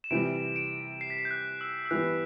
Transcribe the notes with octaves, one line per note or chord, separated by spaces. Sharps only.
E7
C3 E3 G3 D7
D7
C7
B6
C7
G6
F#6
E6
E6
E3 G3 B3 F#6